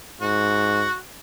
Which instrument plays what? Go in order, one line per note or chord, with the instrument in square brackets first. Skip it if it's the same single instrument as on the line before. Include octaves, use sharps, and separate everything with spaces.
[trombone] G#2 [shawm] F#4